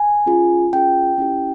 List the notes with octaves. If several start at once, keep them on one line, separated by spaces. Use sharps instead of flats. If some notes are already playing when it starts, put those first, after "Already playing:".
Already playing: G#5
C#4 F4 G#4
C#4 F4 G#4 G5
C#4 E4 G4